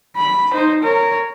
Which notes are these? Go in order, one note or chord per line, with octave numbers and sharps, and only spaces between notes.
B5
D#4 C5
A#4 C#5